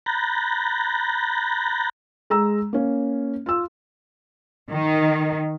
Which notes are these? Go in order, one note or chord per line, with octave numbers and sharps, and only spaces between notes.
A#5 B5 F#6 G6 A6 A#6
G#3 A#5 E6
A#3 C#4
F4 E6
D#3